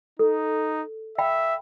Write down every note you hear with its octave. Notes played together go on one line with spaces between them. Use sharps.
D#4 A4
E5 F5 G5 B5